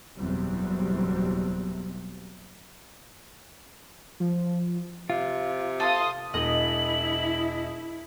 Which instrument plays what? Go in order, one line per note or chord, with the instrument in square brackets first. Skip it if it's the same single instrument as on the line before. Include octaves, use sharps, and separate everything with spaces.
[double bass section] F#1 E2 B2 F#3 G3 C4
[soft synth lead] F3
[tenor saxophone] C3 [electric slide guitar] F4
[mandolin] A4 [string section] F5 C6 D#6
[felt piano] E1 [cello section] E4 [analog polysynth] D#5 [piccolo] F#7